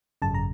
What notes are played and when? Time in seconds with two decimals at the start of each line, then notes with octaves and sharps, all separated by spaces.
0.22 G#1 F#2 C#3 A5
0.34 A#5